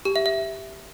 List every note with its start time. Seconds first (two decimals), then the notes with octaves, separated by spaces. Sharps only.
0.05 G4
0.16 E5
0.26 E5